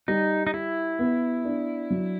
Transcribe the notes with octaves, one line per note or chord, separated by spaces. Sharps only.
G3 D#4
D#4
E4 G4
B3
D4
F#3